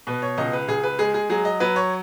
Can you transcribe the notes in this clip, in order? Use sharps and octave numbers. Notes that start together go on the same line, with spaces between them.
B2 B4
C#5
C#2 D#5
B4
C#2 G#4
B4
G#3 G#4
G#4
F#3 G#4
D#5
F#3 B4
C#5